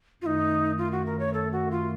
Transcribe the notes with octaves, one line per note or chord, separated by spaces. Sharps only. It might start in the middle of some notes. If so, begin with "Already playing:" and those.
F#2 D#3 A3 D#4 F4
F4
F#4
A#4
C#5
A4
F#4
F4